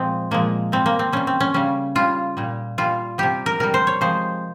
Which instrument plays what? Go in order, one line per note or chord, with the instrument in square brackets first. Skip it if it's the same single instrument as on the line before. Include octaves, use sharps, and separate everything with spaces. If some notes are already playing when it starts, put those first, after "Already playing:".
Already playing: [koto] A#2 F3 G#3 C4
A#2 F3 G#3 A#3
C3 G3 C4
A#3
C4
C3 G3 C#4
C4
C#4
C#3 G3 C#4
C#3 G3 F4
A#2 G3
A#2 G3 F4
C3 G3 G4
A#4
C3 G3 A#4
C5
C#5
C3 F3 G#3 C5